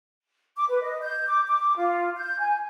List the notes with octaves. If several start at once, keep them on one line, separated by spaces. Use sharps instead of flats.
D6
B4
D#5
G6
D6
D6
F4
G6
G#5